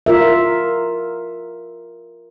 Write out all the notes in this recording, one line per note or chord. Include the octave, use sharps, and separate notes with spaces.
F4 A#4 E5